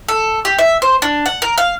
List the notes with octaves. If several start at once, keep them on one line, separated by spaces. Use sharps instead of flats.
A4
G4
E5
C5
D4
F#5
A#4
F5